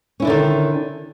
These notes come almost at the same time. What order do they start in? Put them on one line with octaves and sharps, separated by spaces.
C#4 E4 D4 D3 D#3